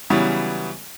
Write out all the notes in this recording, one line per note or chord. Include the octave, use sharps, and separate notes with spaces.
C#3 E3 F#3 G3 B3